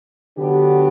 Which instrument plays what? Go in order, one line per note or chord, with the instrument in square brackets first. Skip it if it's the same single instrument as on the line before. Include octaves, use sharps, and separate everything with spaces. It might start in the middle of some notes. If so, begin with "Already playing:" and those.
[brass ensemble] D3 F#3 B3 D4 G4